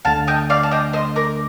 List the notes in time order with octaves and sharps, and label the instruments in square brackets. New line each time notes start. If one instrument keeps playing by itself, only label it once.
[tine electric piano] D2 D3 A3 D4 [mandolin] F5 A5
[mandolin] D#5 G5
D5 F5
A5
D#5 G5
C5 D#5
A#4 D5